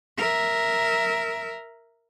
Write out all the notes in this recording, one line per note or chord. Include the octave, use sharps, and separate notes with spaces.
A#4 E5